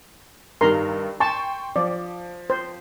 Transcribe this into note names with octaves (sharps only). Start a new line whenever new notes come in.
G2 D#3 G3 A#4 A#5 C6
G5 A5 C6 C#6
F3 D5
C5